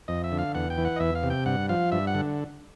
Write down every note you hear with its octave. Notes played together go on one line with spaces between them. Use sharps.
F2 D#5
E5
D3
F5
E2 F#5
G5
E3
F#5
D#5
E2 E5
F5
C3
G5
G2 F#5
F3 F5
G2 E5
F#5
D3